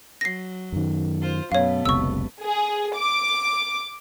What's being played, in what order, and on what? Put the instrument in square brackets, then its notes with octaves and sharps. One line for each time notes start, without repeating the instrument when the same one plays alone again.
[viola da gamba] F#3 [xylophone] A#6 C7
[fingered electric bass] F#2 D#3
[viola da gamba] F4 C5
[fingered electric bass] F#2 [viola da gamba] B2 A3 B3 [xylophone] C#5 F5
[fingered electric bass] F#1 C#2 C3 [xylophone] C#6 E6
[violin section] G#4
D6